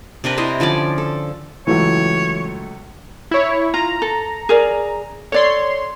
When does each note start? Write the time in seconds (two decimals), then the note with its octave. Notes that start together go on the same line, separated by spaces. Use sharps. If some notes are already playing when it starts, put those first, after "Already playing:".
0.24 C3 D4 A#4 B4
0.37 E4 C5 D#5
0.60 D3 F3 C#4 D5
0.98 A4
1.67 C#2 E3 F#3 A3 C#5
3.31 E4 C#5
3.74 F4 A#5
4.02 A4
4.49 G#4 A#4 D5
5.32 A4 C#5 D5 C6